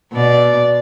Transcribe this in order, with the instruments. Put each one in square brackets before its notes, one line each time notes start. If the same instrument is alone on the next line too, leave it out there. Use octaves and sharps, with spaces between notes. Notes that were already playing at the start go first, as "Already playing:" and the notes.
[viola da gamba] B2 D5